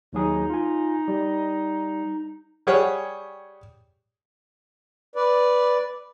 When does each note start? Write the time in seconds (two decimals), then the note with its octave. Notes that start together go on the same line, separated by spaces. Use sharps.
0.13 D#2 F#3 D#4 G#4
0.50 F4 G#5
1.08 G3
2.67 G3 G4 G#4 C#5 F#5
5.16 B4 D5